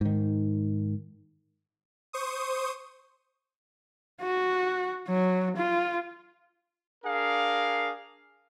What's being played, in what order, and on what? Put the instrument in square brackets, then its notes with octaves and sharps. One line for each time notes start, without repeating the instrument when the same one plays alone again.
[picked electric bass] G#2 D#3
[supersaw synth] C5 C#6 D#6
[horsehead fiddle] F#4
F#3
F4
[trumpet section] D4 G#4 A#4 F5